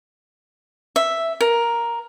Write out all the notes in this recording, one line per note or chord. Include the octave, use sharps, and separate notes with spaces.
E5
A#4